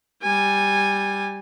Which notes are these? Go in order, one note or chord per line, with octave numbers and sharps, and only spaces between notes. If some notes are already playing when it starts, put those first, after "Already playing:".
G3 G#5